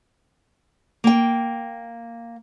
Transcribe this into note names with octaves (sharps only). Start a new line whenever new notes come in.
A#3 G5